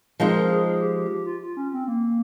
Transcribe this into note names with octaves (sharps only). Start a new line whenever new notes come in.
F3 G#3 C4 D#4 A#4
A#4
G#4
G#4
G4
G4
G4
F4
F4
C#4
C4
A#3